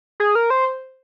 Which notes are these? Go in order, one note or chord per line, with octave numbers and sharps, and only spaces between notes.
G#4
A#4
C5